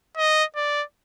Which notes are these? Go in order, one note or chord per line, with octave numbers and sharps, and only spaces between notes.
D#5
D5